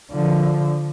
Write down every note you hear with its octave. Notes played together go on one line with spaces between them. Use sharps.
D3 F3